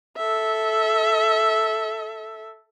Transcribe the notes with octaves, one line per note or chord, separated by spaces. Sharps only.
A4 E5